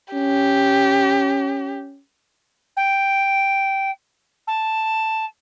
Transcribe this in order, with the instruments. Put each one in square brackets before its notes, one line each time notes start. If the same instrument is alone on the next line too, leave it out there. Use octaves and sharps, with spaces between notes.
[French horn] C#4 [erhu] G4
[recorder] G5
A5